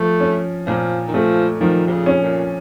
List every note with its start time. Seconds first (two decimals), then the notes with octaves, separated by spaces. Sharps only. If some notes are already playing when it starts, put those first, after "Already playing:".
Already playing: F3 A3
0.20 C#4
0.67 A#2 F3
1.08 D#3
1.14 F3 A3
1.60 D#3 F3
1.87 C3
1.91 C#3
2.06 C#4
2.23 A#2